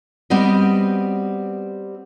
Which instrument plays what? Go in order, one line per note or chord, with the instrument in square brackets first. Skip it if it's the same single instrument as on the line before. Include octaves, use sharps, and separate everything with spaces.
[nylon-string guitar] G3 B3 C4 F#4 D#5